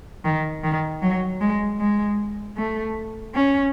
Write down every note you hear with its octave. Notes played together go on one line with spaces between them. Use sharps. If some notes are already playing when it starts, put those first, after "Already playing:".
D#3
D#3
F#3
G#3
G#3
A3
C#4